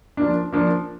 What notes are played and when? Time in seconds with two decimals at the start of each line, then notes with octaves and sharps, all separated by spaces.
0.17 F3 A#3 D4
0.53 F3 A#3 D4